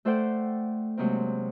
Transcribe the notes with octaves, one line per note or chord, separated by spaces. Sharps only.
A3 A4 C5 D5 F#5 G5
C3 F#3 G#3 A#3 C4